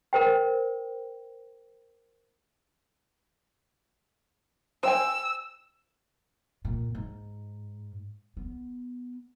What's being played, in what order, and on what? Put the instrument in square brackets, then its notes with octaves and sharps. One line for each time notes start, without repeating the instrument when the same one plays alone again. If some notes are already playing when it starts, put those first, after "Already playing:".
[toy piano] A#4 C5 G5
[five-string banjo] C5 G5 G#5 [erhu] E6
[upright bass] A#2
G#2
B3